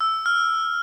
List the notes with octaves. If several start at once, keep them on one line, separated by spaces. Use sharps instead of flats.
E6
F6